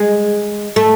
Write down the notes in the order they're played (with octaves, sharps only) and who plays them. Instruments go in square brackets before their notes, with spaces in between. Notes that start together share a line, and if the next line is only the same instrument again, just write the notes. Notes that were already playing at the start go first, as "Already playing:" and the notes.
Already playing: [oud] G#3
A3